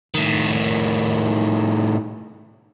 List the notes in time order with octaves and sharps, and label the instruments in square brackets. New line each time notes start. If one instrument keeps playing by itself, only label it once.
[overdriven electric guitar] A2 D#3